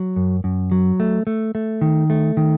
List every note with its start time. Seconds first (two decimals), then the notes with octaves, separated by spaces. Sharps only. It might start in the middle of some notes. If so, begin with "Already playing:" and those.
Already playing: F#3
0.16 F#2
0.44 F#2
0.72 F#3
1.00 A3
1.27 A3
1.55 A3
1.81 D#3
2.10 A3
2.37 D#3